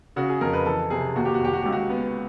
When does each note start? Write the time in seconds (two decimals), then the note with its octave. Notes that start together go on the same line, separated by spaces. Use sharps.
0.16 C#3 F#4
0.29 G#4
0.41 F2 A#4
0.53 B4
0.66 E3 A4
0.90 C3 G#4
1.16 D#2 F#4
1.25 G4
1.34 F#4
1.41 D#2 G4
1.53 F#4
1.62 C#2 G4
1.72 F#4
1.90 B3